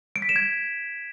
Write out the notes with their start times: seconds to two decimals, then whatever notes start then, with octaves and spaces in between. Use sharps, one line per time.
0.16 D7
0.22 B6
0.29 E7
0.36 G#6